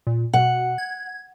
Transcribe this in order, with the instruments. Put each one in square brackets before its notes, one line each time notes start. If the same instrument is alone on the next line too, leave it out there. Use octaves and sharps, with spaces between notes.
[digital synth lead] A#2
[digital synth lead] B2 [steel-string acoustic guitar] F#5
[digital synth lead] G#6